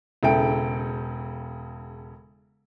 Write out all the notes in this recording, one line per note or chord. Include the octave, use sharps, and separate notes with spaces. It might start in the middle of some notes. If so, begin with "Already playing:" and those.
E1 C#3 E4 A4 G5 D7